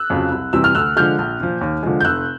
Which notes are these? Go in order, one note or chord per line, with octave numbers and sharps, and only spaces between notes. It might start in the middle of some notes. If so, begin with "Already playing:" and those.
Already playing: E6 F#6
F2 C#3 F#3
C2
C3 E3 G3 E6
F6
D2 E6 F#6
D3 F3 G#3 F6 G6
A#1
A#2 F3
D#2
D3 F3 G#3
G6
F1 E6 F#6